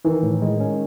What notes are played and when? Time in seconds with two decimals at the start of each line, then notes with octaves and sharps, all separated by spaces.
0.05 D#3 E3
0.23 A2
0.42 G#3
0.60 C#4